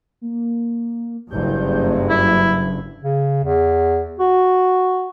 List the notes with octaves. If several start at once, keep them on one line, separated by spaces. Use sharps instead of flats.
A#3
F#1 G2 G6
F#3 E4
C#3
E2
F#4